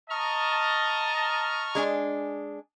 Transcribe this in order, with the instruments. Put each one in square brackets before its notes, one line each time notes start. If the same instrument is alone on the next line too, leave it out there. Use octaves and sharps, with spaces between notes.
[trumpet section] D#5 A5 [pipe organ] A#5 C#6 F6
[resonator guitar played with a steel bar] G#3 D4 G#5